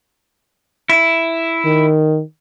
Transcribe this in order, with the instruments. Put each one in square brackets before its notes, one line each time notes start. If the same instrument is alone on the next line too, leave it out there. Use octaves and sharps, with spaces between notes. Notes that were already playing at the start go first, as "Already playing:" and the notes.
[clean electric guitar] E4
[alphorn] D#3